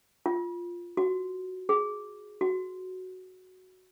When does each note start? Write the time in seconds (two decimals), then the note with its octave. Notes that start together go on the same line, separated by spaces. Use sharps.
0.26 F4
0.97 F#4
1.69 G#4
2.41 F#4